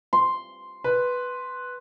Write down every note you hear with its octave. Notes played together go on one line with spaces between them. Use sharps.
C6
B4